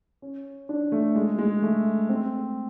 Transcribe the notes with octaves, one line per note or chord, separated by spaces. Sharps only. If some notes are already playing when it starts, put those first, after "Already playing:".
C#4
D4
A3
G#3
G#3
A3
C4